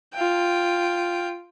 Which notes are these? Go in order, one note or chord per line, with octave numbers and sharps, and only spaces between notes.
F4 G5